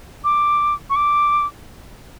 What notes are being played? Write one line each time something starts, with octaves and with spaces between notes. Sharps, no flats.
D6
C#6
D6